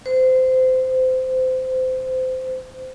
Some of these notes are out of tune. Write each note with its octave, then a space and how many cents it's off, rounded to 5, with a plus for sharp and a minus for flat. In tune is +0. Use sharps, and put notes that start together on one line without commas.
C5 -20